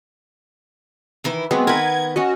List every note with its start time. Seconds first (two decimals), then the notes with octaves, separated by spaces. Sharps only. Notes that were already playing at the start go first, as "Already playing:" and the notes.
1.24 D#3 E3 E4
1.51 F#3 G#3 B3 C4
1.67 D#3 B3 A#4 B4 G#6
2.16 C#4 F#4 C#5 D#5